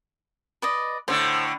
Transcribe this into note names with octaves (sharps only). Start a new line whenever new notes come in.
B4 D5 D#5
A2 D3 C5